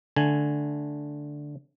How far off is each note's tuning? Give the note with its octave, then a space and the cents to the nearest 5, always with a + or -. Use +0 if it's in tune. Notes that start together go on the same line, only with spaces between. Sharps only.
D3 +0 A3 +0 G#5 +0